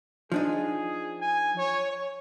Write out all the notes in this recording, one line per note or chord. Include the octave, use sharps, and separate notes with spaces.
F3 D4 D#4 G#4
G#5
C#5
C#5